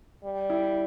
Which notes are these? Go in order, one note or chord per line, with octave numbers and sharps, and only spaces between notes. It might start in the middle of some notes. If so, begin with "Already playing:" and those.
G3
E4